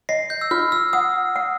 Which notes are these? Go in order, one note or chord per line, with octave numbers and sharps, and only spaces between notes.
D#5 A#6 C7
G6
E6
F4 F6
E6
F#5 D#6
F#5